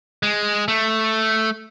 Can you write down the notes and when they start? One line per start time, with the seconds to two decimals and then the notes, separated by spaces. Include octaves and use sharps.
0.23 G#3
0.68 A3